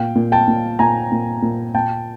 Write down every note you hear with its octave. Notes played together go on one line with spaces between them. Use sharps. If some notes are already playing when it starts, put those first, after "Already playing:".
Already playing: A#2 F5 G5
A#2
G5 A5
A#2
A#2 G#5 A#5
A#2
A#2
A#2 G5 A5